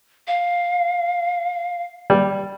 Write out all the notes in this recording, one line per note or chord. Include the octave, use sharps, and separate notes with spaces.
F5
G3